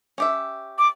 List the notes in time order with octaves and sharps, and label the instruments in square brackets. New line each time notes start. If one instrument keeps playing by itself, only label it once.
[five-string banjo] C#4 G4 E5
[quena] D6